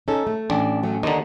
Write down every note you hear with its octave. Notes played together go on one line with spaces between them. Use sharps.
C#4 D#4 A4
A3
A1 D4
F#3 A3 C#4
D#2 D3 D#4